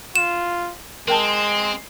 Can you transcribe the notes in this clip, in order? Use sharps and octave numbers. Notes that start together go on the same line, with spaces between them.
F4 E7
G#3 C4 A#4 G5 A5